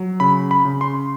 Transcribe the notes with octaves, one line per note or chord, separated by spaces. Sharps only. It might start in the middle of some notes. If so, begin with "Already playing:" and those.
Already playing: F#3
C#3 B5
B5
C#3
C6